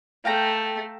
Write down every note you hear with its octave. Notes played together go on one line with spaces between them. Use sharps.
A3 F5 G5 A#5